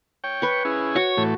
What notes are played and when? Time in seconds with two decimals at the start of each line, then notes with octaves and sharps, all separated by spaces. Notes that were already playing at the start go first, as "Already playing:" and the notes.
0.24 C#5 G5
0.42 B4 C#6
0.65 C#4 E4 G#4
0.96 F#4 C#5
1.17 A2 E3 A3